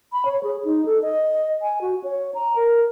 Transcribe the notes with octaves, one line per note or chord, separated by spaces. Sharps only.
B5
C#5
G#4
D#4
A4
D#5
G#5
F#4
C#5
A#5
A#4